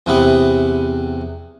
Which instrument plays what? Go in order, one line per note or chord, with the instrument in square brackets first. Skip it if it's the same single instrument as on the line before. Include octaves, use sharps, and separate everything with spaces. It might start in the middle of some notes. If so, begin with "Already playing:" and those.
[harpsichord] E2 C3 B3